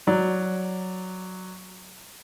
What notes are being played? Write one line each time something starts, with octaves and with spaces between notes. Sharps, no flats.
F#3 D5